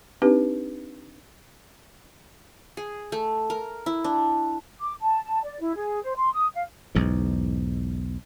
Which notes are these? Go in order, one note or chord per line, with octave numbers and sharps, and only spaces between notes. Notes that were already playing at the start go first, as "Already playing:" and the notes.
C4 D4 D#4 G4 B4
G#4
A3
A#4
E4
D4
D6
A5
A5
D5
E4
G#4
C5
C6
D#6
F5
B1 E2 G#2